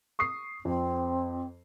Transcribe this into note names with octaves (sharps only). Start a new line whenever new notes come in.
C#6 D#6 C7
F2 C4